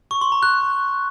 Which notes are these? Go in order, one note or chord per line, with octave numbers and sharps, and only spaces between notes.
C#6
C6
A#5
F#6